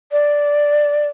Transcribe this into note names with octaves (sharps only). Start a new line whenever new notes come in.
D5